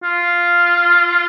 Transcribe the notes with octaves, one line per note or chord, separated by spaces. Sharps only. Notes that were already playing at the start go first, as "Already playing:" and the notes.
F4